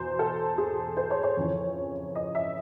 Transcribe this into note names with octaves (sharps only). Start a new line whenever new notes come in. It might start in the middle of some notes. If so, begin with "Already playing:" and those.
Already playing: E2 B2 C5
A4
G#4
C5
C#5
C#5
F2 C#3 E3
D#5
E5